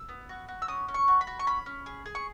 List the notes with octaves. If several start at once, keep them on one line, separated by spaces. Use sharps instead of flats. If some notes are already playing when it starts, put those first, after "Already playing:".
Already playing: E6
B3
F#4
F#4
E6
C#4 D#6
C#4
C#6
F#4
B5
F#4
C#6
C#4 B5
C#4
G#4
G#4
C#6